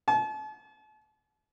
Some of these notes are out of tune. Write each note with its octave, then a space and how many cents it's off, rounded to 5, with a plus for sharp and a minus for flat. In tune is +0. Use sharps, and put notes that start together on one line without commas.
A5 -40